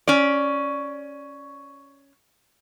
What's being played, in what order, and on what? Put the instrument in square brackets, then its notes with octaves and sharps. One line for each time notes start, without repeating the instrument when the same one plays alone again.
[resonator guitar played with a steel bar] C#4 D5